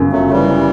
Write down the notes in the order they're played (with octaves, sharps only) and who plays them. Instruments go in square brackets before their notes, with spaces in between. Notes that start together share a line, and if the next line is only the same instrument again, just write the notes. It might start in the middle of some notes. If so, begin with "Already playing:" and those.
Already playing: [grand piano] G1 F#2 C#3
[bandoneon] F#3 A3
A3
E3 G3